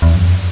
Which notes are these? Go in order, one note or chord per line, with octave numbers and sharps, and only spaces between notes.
E2
F#2